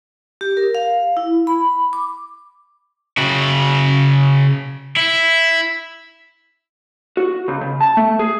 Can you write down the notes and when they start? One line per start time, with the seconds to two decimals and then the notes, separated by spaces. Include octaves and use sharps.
0.41 G4
0.57 A#4
0.75 F5
1.17 E4
1.47 B5
1.93 D6
3.18 C#3 F#4
4.97 E4
7.17 F#4
7.48 C#2
7.61 C#3
7.81 A5
7.97 A3
8.19 G#4